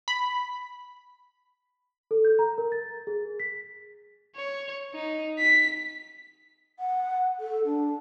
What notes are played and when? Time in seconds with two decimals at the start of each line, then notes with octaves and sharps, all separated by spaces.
0.08 B5
2.11 A4
2.25 G6
2.39 A#5
2.58 A#4
2.72 A6
3.07 G#4
3.40 B6
4.36 C#5
4.94 D#4
5.39 B6
6.79 F#5
7.40 A4
7.65 D4